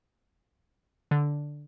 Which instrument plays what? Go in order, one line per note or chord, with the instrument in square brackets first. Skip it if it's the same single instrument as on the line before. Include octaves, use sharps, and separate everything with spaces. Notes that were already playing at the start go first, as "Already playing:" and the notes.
[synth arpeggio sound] D3